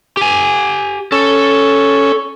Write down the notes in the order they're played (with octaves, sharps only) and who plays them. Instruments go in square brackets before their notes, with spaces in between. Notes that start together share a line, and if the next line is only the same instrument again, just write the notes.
[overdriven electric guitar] G4 G#5
[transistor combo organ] C#4 [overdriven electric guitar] A4